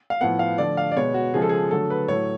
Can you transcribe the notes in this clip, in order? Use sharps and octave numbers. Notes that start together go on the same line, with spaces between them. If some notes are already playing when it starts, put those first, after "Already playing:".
F5
A2 F3 B3 F#5
F5
D3 F3 A3 D5
F5
D5
B2 G#3 B3 C#5
F#4
C#3 F3 G#3 G#4
A4
G#4
D3 F#3 A3 A4
B4
A2 F#3 A3 C#5